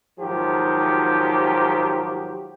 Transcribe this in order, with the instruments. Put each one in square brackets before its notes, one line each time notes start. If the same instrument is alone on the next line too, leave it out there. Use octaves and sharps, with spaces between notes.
[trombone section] G#2 D#3 F3 F#3 G4